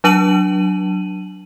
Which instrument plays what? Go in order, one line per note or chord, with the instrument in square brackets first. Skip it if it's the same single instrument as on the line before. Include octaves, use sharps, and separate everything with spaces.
[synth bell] F#3 D4 A5 D#7 F#7